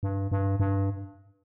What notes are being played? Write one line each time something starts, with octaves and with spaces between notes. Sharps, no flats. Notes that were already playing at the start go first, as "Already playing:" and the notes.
G2
G2
G2